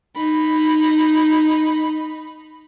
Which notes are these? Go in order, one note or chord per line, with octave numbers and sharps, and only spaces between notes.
D#4 B5